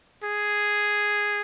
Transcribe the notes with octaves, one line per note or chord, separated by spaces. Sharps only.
G#4